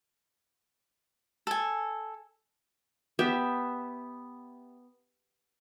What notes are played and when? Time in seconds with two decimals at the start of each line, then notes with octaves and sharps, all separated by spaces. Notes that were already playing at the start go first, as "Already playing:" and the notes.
1.47 A4 G#5
3.19 B3 G4 E5